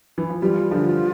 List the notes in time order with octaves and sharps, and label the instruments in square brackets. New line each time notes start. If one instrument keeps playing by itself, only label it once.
[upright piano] E3
F3
[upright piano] E3 G3 [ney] F4
[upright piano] D3 F3